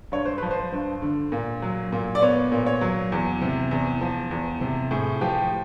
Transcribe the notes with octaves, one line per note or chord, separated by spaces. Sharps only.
G2 C#5
C5
F3 B4
C5
G2
D3
A#2
F#3
A#2
D5
B3 C#5
A#2
C#5
F#3
E2
C3
E2
F3
E2
C3
A2 G#4
F3 G4